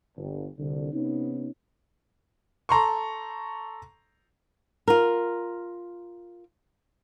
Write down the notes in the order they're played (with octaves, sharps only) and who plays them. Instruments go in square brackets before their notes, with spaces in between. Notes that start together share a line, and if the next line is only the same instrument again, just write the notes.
[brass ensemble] G1
C2 D3
C3 B3 C#4 D#4
[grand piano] A4 A#5 C6 C#6
[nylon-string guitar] F4 A#4